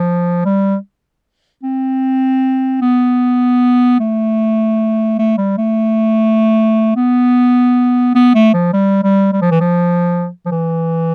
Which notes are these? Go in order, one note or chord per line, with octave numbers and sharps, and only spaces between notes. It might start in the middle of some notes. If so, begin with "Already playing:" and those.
Already playing: F3
G3
C4
B3
A3
A3
G3
A3
B3
B3
A3
F3
G3
G3
G3
F3
E3
F3
F3
E3